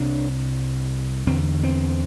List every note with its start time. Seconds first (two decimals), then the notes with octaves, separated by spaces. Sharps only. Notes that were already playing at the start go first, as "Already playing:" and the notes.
Already playing: C2 C3 D4
1.27 E2 D3 C4
1.63 C4